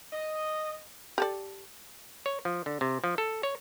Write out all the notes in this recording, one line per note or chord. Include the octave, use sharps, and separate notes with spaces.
D#5
G4 A4 D5
C#5
F3
D3
C3
F3
A4
C#5